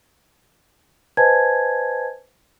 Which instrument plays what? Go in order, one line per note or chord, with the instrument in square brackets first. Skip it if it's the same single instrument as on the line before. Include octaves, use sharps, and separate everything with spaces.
[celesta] B4 C5 D#5 G#5 A5 G#6